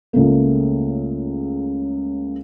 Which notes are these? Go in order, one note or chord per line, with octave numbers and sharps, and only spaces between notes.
C#2 C#3 A3 A#3